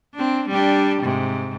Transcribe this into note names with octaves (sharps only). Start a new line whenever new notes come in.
C4 D4
G3 D4 G4
G#2 C3